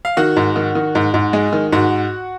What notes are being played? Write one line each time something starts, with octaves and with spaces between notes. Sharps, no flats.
F5
D#3 F#4 F#5
G#2
D#3
D#3
G#2
G#2
G#3
D#3
G#2 F#4 F#5